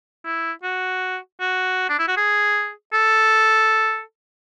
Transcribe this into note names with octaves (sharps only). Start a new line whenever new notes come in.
E4
F#4
F#4
D4
E4
F#4
G#4
A4